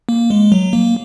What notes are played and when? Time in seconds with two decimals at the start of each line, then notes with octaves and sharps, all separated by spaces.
0.09 A#3
0.30 G#3
0.52 F#3
0.73 A#3